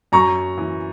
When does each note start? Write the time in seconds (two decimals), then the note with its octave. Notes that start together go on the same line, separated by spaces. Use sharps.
0.12 F#2 A#5 C#6
0.58 E3